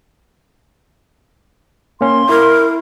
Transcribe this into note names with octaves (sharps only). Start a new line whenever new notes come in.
A#3 C#4 C6
E4 A#4